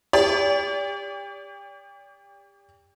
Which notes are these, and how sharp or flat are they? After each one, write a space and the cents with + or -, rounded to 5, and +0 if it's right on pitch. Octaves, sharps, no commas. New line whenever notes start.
G4 +35 D5 -40